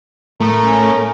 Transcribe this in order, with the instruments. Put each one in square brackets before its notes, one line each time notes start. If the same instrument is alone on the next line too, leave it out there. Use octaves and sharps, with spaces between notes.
[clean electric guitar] A2 [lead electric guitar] A3 [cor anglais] A#4
[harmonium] C#4